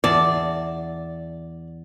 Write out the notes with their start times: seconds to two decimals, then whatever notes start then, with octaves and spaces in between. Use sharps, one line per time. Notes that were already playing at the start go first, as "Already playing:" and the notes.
0.04 E2 D5 A5